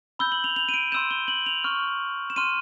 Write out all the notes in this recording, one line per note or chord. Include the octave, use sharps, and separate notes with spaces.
B5 E6 G6 G7
F#7
F7
F7
D#7
D7
C6 E6 G6 E7
G7
F#7
F7
C#6 F6
E7
C6 F6 D#7